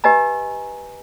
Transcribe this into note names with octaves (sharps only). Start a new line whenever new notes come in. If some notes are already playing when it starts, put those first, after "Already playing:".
G4 B4 D#5 G#5 A#5